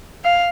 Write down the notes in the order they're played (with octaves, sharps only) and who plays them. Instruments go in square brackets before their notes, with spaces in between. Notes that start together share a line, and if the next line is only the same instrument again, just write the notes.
[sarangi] F5